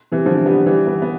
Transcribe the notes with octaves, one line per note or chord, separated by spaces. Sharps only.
C3 E3
D3 F3
G3 B3
E3 G3
G3 B3
B3